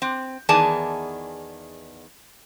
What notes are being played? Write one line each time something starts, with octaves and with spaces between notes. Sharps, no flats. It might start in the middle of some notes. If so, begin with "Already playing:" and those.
C4
E2 D#3 B3 G#4 D5 A5